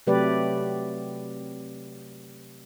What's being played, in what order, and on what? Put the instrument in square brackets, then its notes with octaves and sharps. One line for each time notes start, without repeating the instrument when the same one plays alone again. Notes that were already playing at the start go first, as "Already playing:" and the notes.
[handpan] C3 F#3 A3 G4 B4 D5